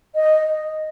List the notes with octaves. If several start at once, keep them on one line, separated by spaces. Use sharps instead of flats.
D#5